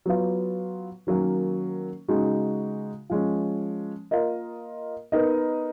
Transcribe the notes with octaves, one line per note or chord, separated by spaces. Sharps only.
F#3 B3 F4
D#3 F#3 A#3 C#4
C#3 G#3 D#4 F#4
F3 G#3 C#4
A#3 F4 A#4 D#5
B3 D#4 A#4 D#5